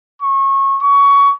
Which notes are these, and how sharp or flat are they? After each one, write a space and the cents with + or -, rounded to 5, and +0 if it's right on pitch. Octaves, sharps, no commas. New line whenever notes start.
C#6 -25
C#6 +20